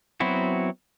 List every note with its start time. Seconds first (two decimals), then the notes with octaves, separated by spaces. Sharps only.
0.20 F#3 B3 C4 E4 F#4